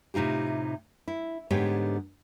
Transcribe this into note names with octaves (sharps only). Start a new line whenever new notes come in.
A2 C3 D#4 F4 G4
E4
G#2 D3 B3 G4 C#5